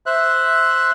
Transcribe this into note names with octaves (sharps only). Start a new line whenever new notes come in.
C5 E5 F#6